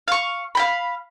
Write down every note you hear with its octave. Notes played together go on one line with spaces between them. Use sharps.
F5 C#6
F5 G5 B5